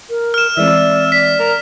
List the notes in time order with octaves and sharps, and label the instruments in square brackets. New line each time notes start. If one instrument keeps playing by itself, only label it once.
[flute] A#4
[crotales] F6 E7
[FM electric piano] E3 G#3 C4 [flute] D5 [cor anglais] E5
[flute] D5 [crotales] B6
[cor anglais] A#4